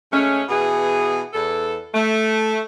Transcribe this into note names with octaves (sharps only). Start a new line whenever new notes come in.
C#3 G#3 A3 C#4
B2 E3 B3 G#4
E2 A4
A3